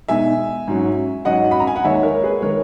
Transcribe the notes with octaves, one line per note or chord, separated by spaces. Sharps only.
B2 G#3 D#4 E5 G#5
G#2 F#3 C#4
G#2 F#3 C#4 D#5 F#5
B5
A#5
G#5
F#5
D#2 D#3 G#3 D#4 C#5 E5
A#4 C#5
G#4 B4
D#3 G#3 D#4 A#4 C#5